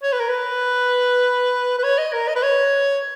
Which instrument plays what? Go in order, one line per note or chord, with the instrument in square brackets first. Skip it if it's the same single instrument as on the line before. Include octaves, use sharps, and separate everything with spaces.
[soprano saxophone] C#5
B4
A#4
B4
B4
C#5
D#5
A#4
D#5
B4
C#5